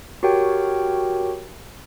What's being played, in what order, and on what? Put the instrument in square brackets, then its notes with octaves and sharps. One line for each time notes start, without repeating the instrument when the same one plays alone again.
[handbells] F#4 G4 A#4 C#5 G5